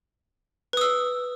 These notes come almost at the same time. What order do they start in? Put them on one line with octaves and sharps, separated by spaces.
B4 D#6 E6